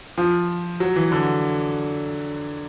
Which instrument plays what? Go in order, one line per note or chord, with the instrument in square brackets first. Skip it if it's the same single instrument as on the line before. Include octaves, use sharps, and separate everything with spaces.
[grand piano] F3
F#3
E3
D3